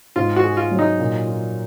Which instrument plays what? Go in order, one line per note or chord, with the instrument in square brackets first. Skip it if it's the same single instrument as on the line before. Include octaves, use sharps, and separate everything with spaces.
[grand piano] G#2 [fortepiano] F4
[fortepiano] F#4
[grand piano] G#4
[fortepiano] F4
[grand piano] F#3
[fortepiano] D#4
[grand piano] A#2
F4